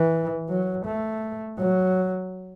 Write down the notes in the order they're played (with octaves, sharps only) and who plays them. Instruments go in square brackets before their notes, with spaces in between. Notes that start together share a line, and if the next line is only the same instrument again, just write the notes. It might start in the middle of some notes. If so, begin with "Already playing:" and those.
Already playing: [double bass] E3
F#3
A3
F#3